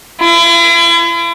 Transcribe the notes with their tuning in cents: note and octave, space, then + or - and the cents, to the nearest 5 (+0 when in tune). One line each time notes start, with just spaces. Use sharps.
E4 +45